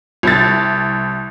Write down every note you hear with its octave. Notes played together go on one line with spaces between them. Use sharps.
C2 A6